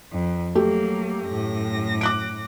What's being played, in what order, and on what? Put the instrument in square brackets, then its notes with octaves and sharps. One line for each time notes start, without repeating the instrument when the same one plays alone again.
[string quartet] F2
[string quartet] F#3 A#3 [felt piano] A3 G4
[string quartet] F#2 A2 A#6
[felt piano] D6 F#6 D7